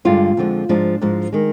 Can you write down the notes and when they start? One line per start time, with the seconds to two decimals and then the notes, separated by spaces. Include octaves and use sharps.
0.05 G2 D3 G#3 F4
0.37 F2 D3 F3 G#3
0.69 G#2 F3 G#3 D4
1.02 G#2 F3 G#3
1.33 D#3 G#3